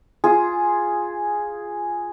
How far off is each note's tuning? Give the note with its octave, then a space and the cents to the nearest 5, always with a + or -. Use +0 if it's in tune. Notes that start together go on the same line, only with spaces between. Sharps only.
F4 +0 G#4 +0